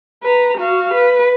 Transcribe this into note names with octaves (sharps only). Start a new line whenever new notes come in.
B4 A#5
F#4 F5
B4